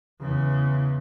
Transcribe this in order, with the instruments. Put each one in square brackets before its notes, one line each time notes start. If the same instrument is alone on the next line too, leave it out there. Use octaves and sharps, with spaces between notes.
[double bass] E2 C#3